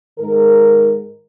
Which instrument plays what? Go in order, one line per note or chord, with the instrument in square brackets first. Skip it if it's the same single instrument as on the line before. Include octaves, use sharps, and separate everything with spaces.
[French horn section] G#2 D#3 G#3 A#4